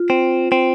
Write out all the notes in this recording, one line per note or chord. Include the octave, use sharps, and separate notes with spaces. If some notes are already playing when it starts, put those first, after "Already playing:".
Already playing: F4
C4
C4